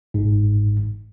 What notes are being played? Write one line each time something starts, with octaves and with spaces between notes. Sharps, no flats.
G1 G#2